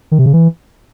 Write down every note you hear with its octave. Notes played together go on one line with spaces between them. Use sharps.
D#3
C3
C#3
E3